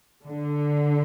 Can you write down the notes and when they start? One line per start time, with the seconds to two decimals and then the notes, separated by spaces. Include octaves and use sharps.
0.26 D3